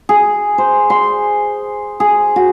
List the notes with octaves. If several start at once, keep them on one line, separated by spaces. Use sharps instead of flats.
G#4
C5
C6
G#4
F#4